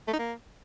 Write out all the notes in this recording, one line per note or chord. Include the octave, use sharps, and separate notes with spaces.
A3
D#4
A#3